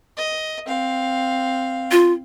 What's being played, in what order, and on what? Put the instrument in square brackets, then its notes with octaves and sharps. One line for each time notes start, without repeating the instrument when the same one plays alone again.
[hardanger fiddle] D#5
C4 F5
[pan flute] F4